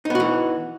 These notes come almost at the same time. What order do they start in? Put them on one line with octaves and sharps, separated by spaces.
D#4 B3 F#4 E3